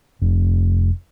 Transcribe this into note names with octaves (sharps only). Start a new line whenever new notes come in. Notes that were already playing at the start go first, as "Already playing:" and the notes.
F1